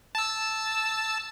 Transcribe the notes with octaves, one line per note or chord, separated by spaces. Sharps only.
A5 E6